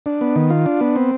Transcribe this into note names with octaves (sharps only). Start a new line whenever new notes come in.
D4
B3
D#3
F4
D4
B3
C4